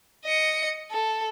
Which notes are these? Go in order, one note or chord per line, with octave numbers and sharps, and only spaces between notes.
D#5 C#7
A4